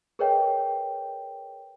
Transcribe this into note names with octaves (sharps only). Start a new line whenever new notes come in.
G#4 A#4 B4 C#5 D#5 G5